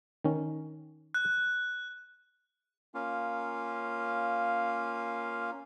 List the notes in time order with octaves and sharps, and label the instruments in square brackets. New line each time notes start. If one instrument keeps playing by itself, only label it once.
[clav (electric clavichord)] D#3 C#4
[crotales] F#6
[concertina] A#3 C#4 F4 F5